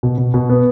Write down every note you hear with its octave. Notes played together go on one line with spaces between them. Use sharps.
B2
B2
B2
B3